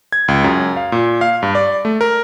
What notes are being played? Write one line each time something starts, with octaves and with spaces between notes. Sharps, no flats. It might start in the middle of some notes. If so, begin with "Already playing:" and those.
G#6
C#2
F#2
F5
A#2
F5
G2
D5
A3
A#4